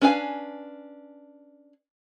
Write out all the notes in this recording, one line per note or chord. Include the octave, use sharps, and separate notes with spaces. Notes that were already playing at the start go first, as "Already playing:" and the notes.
C#4 D4 B4 F5 G#5